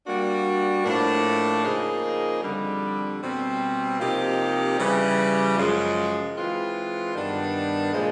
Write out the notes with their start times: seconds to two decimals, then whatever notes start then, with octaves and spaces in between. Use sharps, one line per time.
0.06 G3 A#3 D4 F#4
0.85 A2 F3 A#3 D4
1.64 C#3 F3 A#3 D#4 G#4
2.42 F2 D3 G3
3.21 B2 G3 C4
3.99 C3 F3 A#3 D#4 G4
4.78 C#3 E3 G3
5.57 F#2 C#3 F3 G#3
6.36 E3 G#3 C4 F4
7.14 G2 D#3 G3 B3 D4
7.93 A#2 F3 G#3